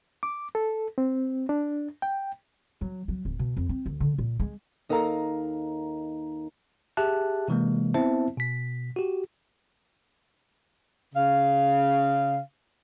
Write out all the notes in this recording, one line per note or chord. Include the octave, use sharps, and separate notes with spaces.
D6
A4
C4
D4
G5
F#3
F#3
D1
B2
F2
C4
D2
D3
A#2
G#3
D#2 D#4 A4 A#4 F5 A#5
G4 G#4 E5 A5 F#6
C3 E3 G#3 A#3
B3 C4 E4 C5 E5 A5
B2 B6
F#4 G4
C#3 F5